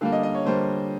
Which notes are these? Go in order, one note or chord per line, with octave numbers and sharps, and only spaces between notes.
D3 G3 A#3 F5
D#5
D#5
C#5
D3 G3 A#3 C5